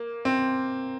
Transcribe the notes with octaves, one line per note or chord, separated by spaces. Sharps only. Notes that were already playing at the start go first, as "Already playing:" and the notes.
Already playing: A#3
C4